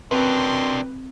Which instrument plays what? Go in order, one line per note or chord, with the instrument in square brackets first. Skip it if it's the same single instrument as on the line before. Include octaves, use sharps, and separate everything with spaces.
[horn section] F#2 G5 C6 [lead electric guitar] C3 D4 [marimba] C4 [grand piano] B4